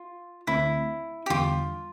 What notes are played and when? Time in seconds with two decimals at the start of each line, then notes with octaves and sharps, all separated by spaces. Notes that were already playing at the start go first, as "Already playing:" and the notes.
Already playing: F4
0.47 D2 D3 A3 C4 E4
1.26 G4
1.30 E2 D3 G3 B3 F4